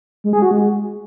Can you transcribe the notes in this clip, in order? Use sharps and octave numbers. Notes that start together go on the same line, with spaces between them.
G#3
G#4
F#4
G#3